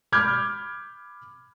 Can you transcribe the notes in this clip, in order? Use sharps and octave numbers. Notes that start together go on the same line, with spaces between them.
B5 D6 F6 G6 G#6